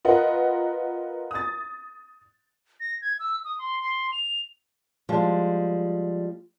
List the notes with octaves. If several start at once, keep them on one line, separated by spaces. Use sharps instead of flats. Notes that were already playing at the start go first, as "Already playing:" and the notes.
F4 A#4 B4 D#5 F#5
D#6 A6
A#6
G#6
E6
D#6
C6
C6
F7
F3 G3 G#3